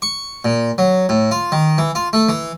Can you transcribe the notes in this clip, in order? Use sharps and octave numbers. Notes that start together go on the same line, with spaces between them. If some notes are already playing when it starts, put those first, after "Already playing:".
C#6
A#2
F#3
A2
F4
D#3
E3
F4
A3
E3